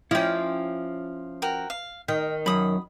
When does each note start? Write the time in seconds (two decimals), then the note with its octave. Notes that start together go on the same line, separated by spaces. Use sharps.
0.11 F3 C#4 E4 D5 G5
1.42 F#4 A#4 G5
1.70 F5
2.08 D#3 G5
2.46 F#2 B5 D#6